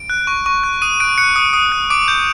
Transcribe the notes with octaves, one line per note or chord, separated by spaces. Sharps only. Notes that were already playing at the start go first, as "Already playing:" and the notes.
Already playing: D7
F#6
C#6
C#6
F#6
D#6 D#7
F#6 D7
F#6 C#7
D#6
D#6
F#6
D6 D7
G6